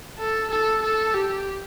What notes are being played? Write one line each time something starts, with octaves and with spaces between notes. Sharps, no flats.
A4
A4
A4
G4